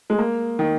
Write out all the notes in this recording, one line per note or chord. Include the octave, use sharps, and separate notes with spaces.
G#3
A#3
D#3